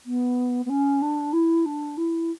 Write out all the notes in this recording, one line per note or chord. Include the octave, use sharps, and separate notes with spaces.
B3
B3
C#4
D4
E4
D4
E4